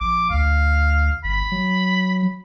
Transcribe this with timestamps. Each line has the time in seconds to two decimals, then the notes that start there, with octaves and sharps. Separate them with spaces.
0.01 A#1 D6
0.30 D2 F5
1.24 G1 B5
1.52 F#3